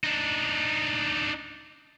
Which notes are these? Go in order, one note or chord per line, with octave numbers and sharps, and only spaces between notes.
D4 D#4